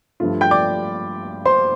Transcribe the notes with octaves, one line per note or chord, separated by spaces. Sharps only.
G2 F3 A3 F4
G5 G6
D5 D6
C5 C6